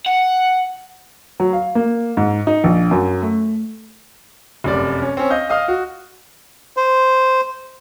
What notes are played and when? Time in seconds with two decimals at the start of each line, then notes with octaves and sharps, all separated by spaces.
0.06 F#5
1.40 F#3
1.53 F5
1.75 A#3
2.17 G#2
2.47 D#4
2.64 A#1
2.91 F#2
3.22 A3
4.64 F1 F#2 D5
5.02 C#4
5.17 C4 C#4
5.30 D#5 F5 G6
5.50 D#5 F5 D#6 F6
5.68 F#4
6.77 C5